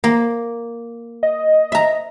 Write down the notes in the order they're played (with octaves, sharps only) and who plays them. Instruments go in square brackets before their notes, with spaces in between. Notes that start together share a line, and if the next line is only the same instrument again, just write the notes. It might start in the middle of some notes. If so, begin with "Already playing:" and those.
[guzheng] A#3
[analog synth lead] D#5
[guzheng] E5 A#5